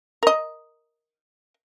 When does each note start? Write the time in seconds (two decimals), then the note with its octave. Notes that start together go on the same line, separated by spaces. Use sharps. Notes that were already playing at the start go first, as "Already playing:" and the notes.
0.23 A#4 D#5